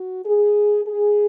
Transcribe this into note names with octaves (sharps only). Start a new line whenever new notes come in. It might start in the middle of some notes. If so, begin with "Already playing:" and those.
Already playing: F#4
G#4
G#4